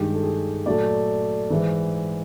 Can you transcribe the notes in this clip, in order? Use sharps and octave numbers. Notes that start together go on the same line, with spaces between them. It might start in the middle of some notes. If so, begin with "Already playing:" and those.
Already playing: G2 D#3 G#3 G4
A4
G#4
A#2 F#3 A3 D5
G#2 E3 G#3